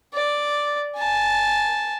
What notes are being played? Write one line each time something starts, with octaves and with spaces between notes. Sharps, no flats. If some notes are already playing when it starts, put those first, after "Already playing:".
D5
G#5 A5